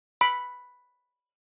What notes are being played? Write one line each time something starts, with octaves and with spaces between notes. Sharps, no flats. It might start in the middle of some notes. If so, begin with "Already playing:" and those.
B5